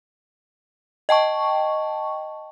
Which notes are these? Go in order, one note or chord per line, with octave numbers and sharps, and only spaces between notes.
D#5 G5 A5 C#6